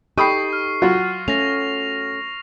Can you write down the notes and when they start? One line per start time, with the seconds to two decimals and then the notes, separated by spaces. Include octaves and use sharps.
0.18 D#4 G4 A4 G5 B5 C#6 D#6 C7
0.53 F6
0.82 F#3 F4 F#4
1.28 A3 C#4 A#6 F7